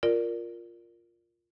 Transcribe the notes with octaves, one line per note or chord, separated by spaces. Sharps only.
F4 A#4 D5